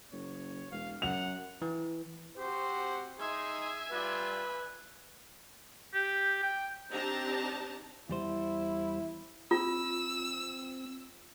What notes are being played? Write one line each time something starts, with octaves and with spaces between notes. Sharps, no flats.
F#1 C#5
E1 F5
F#2 F#5 F7
E3
C4 F#4 G4 C5
D#4 G#4 E5 G#5 C6
G3 F4 B4 D5
G4
G5
C4 D4 D#4 G4 A5 A#5
E2 G3 E4 C5
C4 F4 E6